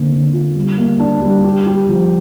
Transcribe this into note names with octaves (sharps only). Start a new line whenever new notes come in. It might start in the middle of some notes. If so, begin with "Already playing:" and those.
Already playing: D3 A#3 C4
D3
F4
G3
A#3
D4
G3
G4
G4
F3